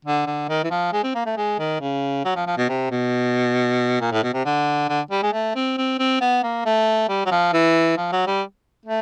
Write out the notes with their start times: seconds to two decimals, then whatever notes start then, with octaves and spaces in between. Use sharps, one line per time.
0.05 D3
0.27 D3
0.49 D#3
0.64 E3
0.71 F3
0.93 G#3
1.04 C4
1.15 A#3
1.26 A3
1.37 G#3
1.59 D#3
1.81 C#3
2.25 F#3
2.36 F3
2.47 F3
2.57 B2
2.69 C3
2.91 B2
4.01 A#2
4.12 A2
4.23 B2
4.34 C3
4.45 D3
4.89 D3
5.11 G3
5.22 G#3
5.33 A3
5.55 C4
5.78 C4
5.99 C4
6.21 B3
6.43 A#3
6.65 A3
7.09 G3
7.26 F#3
7.31 F3
7.53 E3
7.97 F3
8.12 F#3
8.27 G3
8.86 A3